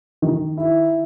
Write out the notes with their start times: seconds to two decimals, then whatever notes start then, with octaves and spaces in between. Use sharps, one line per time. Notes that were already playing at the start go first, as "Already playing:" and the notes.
0.22 D#3
0.57 E4